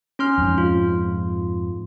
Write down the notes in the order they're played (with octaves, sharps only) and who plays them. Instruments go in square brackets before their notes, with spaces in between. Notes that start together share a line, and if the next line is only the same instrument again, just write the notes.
[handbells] C#4 C6 F6
[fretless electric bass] F2 G#2
[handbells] F4